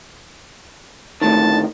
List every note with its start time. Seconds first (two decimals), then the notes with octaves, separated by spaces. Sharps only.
1.22 D2 A2 D#3 A5